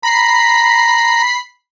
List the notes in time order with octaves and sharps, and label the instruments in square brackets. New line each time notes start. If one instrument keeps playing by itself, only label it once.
[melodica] A#5 [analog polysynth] B5 B6 C7